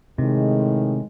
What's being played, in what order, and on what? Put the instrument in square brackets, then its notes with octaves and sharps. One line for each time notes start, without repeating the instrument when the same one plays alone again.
[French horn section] A2 D#3 G#3 [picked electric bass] C3